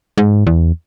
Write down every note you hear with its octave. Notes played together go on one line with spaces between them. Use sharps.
G#2
E2